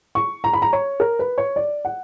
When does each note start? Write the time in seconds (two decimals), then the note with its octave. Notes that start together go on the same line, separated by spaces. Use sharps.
0.15 C#6
0.44 A#5
0.53 B5
0.62 A#5
0.73 C#5
1.00 A#4
1.19 B4
1.38 C#5
1.56 D5
1.85 F#5